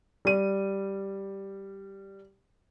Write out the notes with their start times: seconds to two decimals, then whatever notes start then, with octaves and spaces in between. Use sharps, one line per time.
0.25 G3 D#7